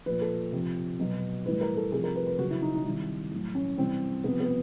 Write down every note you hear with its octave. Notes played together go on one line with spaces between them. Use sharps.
A#2 F3 B4
A4
C3 F3
B2 F#3
A2 E3 G3 B4
A#4
A4
C3 F3 G#4
A#4
B4
B4
C#3 F#3 F#4
E4
D#4
D#4
C3 D#3 G3 E4
A2 F#3
C#4
C3 E3 G3 C4
C3 F3 B3
B3